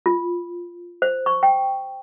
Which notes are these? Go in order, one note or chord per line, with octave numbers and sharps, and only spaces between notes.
F4
C5
C#6
G5